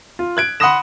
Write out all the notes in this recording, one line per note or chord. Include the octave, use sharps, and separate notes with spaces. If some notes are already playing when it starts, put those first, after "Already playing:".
F4
F#6 G#6 D7
F#5 B5 C6 D#6 A#6 E7